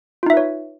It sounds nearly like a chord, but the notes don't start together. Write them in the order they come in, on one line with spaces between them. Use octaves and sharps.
F4 D#4 E5 B4 C#5